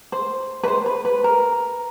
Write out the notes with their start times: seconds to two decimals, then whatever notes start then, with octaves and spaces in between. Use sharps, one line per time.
0.12 C5
0.63 B4
0.68 C5
0.86 B4
1.05 B4
1.24 A#4